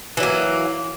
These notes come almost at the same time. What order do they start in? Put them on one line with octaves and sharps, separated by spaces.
E3 F#3 A#3